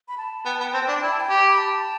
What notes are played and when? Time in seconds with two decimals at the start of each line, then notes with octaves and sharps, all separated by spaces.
0.08 B5
0.18 A5
0.46 B3 G5
0.55 A5
0.60 B3
0.64 G5
0.73 C4 A5
0.83 G5
0.88 D4
0.93 A5
1.02 E4 G5
1.11 A5
1.20 G5
1.30 G4
1.50 B5
1.58 A5